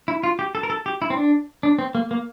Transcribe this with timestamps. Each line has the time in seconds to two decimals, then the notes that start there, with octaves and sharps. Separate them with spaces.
0.08 E4
0.23 F4
0.39 G4
0.55 A4
0.63 A#4
0.70 A4
0.86 G4
1.02 E4
1.10 C4
1.16 D4
1.63 D4
1.79 C4
1.95 A#3
2.11 A#3